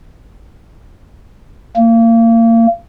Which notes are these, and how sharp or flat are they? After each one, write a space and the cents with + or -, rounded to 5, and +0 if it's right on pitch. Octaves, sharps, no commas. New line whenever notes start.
A#3 -30